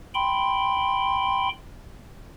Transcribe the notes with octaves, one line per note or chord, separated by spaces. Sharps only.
G5 B5 C6